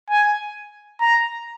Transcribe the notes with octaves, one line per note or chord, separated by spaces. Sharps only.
G#5
A#5